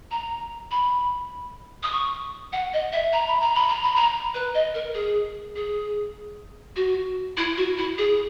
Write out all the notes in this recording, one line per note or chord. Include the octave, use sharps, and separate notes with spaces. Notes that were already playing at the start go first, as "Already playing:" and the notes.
A#5
B5
D#6
C#6
F#5
D#5
E5
A#5
B5
A#5
B5
A#5
B5
A#5
B4
D#5
A#4
G#4
G#4
F#4
E4
F#4
E4
G#4